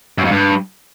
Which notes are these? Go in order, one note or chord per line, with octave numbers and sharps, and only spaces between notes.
F#2
F2
G2